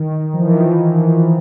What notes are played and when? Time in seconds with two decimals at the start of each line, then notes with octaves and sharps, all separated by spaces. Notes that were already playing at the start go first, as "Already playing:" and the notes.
Already playing: D#3
0.34 F3
0.40 E3
0.47 D#3